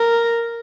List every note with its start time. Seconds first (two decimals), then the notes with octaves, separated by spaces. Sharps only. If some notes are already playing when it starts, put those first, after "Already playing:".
Already playing: A#4